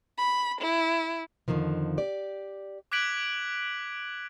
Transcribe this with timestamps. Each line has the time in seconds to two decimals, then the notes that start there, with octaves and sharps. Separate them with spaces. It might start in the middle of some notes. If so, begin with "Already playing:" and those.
0.17 B5
0.61 E4
1.48 F2 A#2 D3 D#3 F3
1.98 G4 D5
2.92 D6 F#6 G#6 B6 D7 F#7